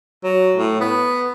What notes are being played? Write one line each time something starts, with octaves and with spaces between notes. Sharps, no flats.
F#3
A2
B3